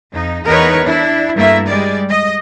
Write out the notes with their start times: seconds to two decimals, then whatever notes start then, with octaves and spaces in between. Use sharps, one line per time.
0.13 F2 D#4
0.46 E2 B3 D#4 A#4 B4 C#5
0.85 D4 E4
1.35 G2 A3 A#3 E4 A#4 E5
1.68 G3 G#3 D5
2.09 D#5